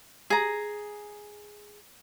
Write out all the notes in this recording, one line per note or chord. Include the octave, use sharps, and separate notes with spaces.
G#4 A#5